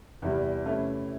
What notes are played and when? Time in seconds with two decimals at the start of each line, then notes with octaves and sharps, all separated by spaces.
0.22 E2 C3 E3 G3
0.66 C3 E3 A3 C#4 E4